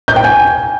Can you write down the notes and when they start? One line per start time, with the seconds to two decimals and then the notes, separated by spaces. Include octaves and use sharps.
0.08 G6
0.16 G5
0.24 G#5